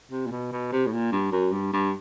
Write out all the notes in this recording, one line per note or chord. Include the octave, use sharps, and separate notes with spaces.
C3
A#2
B2
B2
C3
A2
A#2
G2
F#2
G2
G2